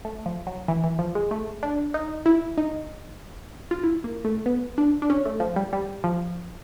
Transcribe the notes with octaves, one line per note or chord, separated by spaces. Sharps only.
A3
F3
F#3
E3
E3
F3
G#3
A3
D4
D#4
E4
D#4
F4
E4
A#3
A3
B3
D4
D4
C#4
A3
F3
G3
G3
F3